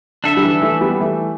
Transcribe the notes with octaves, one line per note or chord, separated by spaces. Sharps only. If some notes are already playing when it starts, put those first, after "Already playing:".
D3 D4 A4 E5
G3
E3
E3 A3
G3 B3
E3 A3